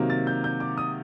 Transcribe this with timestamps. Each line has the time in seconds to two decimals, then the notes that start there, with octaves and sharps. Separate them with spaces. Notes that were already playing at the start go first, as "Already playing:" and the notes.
Already playing: C3 D#3 F#3 A#3
0.10 A6
0.27 G6
0.44 G6
0.60 D6
0.78 D#6